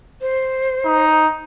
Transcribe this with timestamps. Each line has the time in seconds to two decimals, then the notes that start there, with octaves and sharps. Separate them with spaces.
0.21 C5
0.85 D#4